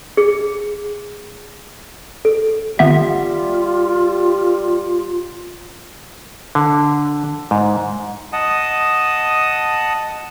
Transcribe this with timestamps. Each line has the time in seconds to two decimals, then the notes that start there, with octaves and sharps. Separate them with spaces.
0.17 G#4
2.25 A4
2.79 G#1 G3 B3 F4 E5
6.55 D3
7.51 G#2
8.33 D#5 F#5 A5 D#6